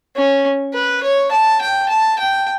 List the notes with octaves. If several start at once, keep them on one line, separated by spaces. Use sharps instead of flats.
C#4
B4
C#5
A5
G5
A5
G5